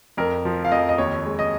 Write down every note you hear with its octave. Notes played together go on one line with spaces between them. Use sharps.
F2 A#4
F3
F5
F2 D#5
D#5
D#2 C#5
G#3
D#5